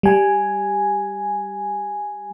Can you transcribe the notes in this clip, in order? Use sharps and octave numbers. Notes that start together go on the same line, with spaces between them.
G3 G#5